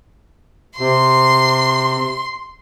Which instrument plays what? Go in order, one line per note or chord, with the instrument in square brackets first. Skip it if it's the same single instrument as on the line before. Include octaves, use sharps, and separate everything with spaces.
[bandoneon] C3 [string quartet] C6